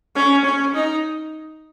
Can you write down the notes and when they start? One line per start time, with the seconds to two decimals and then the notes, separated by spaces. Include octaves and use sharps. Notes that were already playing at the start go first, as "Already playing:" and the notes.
0.16 C#4
0.45 C#4
0.74 D#4